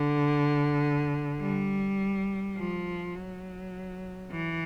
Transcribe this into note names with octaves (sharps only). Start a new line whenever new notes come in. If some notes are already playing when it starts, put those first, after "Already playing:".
Already playing: D3
G3
F3
F#3
E3